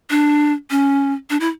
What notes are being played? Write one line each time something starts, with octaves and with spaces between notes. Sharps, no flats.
D4
C#4
D4
E4